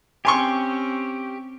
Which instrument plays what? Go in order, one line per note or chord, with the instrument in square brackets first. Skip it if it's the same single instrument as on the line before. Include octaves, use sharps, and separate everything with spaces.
[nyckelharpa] C4 C#4 [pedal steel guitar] G4 [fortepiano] G#5 C6 C#6